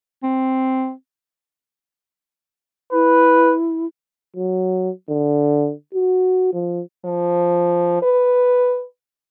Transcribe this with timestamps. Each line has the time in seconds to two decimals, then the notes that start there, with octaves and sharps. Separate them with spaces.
0.23 C4
2.93 E4 B4
4.36 F#3
5.09 D3
5.94 F#4
6.53 F3
7.05 F3
8.03 B4